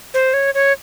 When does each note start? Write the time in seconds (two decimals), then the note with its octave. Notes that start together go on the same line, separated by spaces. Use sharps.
0.14 C5
0.34 C#5
0.54 C#5